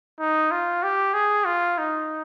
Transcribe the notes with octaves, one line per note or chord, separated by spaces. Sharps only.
D#4
F4
G4
G#4
F4
D#4